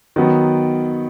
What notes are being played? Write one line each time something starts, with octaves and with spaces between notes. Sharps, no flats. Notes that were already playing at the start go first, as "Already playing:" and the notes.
D#3 F#3 B3